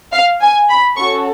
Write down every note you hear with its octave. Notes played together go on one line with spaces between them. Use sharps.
F5
G#5
B5
C#4 F#4 A4 C#6